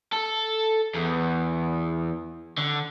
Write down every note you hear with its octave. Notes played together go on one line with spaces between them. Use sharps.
A4
E2
D3